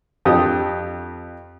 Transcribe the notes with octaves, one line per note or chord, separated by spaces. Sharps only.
F2 G4 D#6